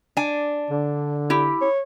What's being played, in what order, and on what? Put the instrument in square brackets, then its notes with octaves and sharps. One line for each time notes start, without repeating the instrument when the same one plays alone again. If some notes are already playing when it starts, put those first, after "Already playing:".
[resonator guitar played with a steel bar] D4 G#5
[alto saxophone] D3
[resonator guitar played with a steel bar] E4 G4
[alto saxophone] C#5